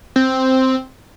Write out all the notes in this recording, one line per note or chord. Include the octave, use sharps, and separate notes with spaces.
C4